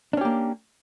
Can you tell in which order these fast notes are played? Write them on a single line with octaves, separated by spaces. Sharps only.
D4 C#4 G4 A#3